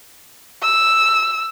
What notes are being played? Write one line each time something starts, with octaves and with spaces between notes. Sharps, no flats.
E6